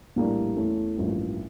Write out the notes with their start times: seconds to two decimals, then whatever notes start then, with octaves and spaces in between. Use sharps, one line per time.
0.16 A#1 A2 G3 A#3 D4
0.56 E2 E3 A3 C#4
0.97 A1 G2 F3 A#3